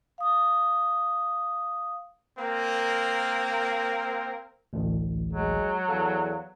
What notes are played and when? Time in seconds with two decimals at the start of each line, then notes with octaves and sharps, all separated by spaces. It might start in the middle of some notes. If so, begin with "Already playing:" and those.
0.18 F5 D#6
2.38 A#3 C4 A#4
4.73 A1 D2
5.33 F#3 G#3
5.89 E2 A4 F5